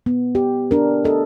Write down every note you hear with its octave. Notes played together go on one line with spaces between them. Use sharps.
B3
G4
D4 A#4
A4 D#5